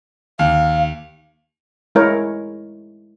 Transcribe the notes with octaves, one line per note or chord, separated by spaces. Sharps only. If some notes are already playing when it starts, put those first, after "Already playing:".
D#2 F5
G#3 E4 A#4 C#5